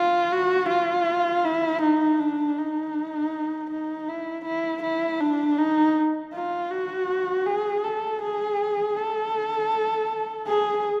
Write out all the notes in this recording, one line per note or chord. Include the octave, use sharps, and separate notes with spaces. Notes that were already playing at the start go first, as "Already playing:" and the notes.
Already playing: F4
F#4
F4
E4
D#4
D4
D#4
D#4
E4
E4
E4
D4
D#4
F4
F#4
G#4
A4
G#4
A4
G#4